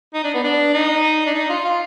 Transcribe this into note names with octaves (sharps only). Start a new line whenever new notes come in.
D#4
D4
B3
D4
D#4
D4
D#4
F4
F4